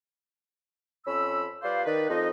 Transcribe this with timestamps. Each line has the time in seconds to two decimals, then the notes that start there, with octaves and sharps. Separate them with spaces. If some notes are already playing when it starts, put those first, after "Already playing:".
1.06 F2 C#4 B5 E6
1.62 G3 F4 B4 C5 D5 F5
1.85 D#3 B4 D5
2.09 F2 D#4 D#5